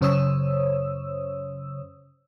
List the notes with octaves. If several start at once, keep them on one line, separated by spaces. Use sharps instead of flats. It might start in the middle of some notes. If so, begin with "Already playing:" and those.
F#2 C#3 C5 C#5 D#6 E6